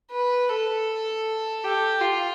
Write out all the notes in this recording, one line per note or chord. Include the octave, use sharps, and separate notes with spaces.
B4
A4
G4
F4